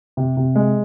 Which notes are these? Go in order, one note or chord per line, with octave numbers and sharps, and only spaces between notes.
C3
C3
G#3